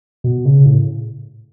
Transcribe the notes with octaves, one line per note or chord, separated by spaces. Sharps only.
B2
C#3
A2